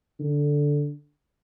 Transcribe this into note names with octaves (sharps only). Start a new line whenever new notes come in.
D3